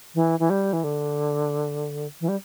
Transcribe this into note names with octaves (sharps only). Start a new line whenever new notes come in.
E3
E3
G3
E3
D3
E3
G3